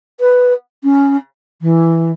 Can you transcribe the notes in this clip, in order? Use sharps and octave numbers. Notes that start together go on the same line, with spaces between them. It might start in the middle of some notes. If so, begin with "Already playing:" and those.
B4
C#4
E3